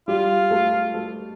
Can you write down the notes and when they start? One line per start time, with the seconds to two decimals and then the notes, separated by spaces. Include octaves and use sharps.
0.08 G3 F4 G4
0.51 A3 A4
0.94 A3 A4